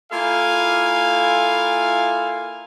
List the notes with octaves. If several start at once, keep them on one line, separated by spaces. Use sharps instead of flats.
A#3 E4 F4 A4 F5 G#5